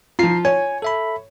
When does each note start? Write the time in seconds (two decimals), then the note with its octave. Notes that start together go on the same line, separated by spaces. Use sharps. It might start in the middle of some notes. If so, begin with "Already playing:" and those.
0.19 F3 F4 A#5 C7
0.45 C#5 G#5
0.82 A4 E5 B5